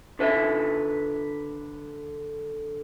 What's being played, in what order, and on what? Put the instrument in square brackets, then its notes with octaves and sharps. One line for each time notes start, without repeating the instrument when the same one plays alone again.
[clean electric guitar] D3 B4 E5